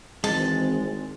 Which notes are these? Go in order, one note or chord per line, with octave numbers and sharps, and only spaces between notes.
G#1 E3 G#3 C4 A5